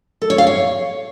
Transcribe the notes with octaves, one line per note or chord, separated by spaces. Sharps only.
A4
C#5
F5
C#5